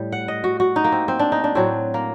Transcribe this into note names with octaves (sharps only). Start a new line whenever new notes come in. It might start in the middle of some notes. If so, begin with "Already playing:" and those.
Already playing: A2 G3
F#5
D#5
F#4
F#4
D#4
A#3
C4
C4
D4
D#4
D4
A2 F#3 C4
A#3